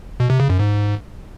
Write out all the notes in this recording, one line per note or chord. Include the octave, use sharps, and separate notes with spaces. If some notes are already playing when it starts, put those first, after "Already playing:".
B2
C3
C#3
F#2
G#2